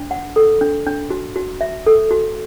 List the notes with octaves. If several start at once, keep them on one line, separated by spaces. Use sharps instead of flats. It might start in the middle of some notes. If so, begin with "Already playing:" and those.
Already playing: D4
F#5
A4
D4
D4
F#4
F#4
E5
A4
F#4